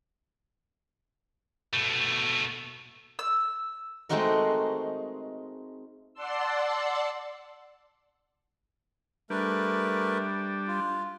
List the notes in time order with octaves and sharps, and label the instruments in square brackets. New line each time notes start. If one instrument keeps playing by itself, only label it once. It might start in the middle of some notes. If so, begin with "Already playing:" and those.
[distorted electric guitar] B2 A3
[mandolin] E6
[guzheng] G#3 A3 C4 D#4 F#4 A#4
[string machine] D5 F#5 A5 C6 E6
[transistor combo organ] G3 D4 [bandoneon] A3 A#4 B4
[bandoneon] F4